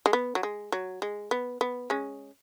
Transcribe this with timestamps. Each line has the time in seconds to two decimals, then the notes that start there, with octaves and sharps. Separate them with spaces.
0.06 G#3
0.13 B3
0.35 F#3
0.43 G#3
0.72 F#3
1.02 G#3
1.31 B3
1.61 B3
1.90 G#3 C#4